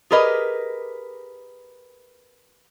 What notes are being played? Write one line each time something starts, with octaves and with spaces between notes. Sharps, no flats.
G4 G#4 A#4 B4 D#5